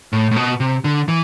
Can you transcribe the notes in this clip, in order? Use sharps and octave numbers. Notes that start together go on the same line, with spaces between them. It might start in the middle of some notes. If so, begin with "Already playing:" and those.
A2
A2
B2
C3
D3
E3